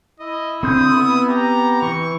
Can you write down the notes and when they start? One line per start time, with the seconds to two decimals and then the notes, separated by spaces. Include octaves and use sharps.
0.20 E4 D#5
0.63 D3 C4 C6 D#6 G6
0.96 B3
1.29 G4 A#5
1.82 E3 C#6